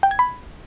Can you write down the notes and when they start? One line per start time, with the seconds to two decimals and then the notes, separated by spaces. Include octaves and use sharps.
0.03 G5
0.11 G#6
0.19 B5